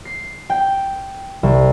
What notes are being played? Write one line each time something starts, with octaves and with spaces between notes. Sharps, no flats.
C7
G5
C2